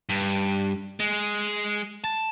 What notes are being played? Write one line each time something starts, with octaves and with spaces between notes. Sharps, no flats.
G2
G#3
A5